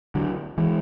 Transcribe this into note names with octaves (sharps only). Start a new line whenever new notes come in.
D3 F#3
E3 G#3